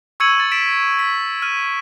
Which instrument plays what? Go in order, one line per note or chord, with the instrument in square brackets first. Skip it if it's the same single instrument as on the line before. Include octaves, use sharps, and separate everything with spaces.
[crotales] C#6 E6 G#6 C#7 D#7 F#7
A6
B6 D7 E7
B6
F6 D#7